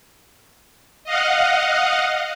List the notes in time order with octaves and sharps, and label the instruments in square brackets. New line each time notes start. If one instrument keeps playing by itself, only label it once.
[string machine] D#5 F5 F#5